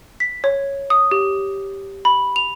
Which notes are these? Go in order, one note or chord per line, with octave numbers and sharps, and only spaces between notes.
B6
C#5
D#6
G4
B5
F7